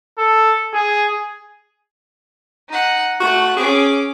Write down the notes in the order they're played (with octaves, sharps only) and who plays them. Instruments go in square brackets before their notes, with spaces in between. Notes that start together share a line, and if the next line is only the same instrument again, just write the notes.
[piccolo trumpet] A4
G#4
[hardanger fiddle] D#4 F#5
[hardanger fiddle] A3 F#5 [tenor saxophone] F#4
[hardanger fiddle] C#4 D6 [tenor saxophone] G#4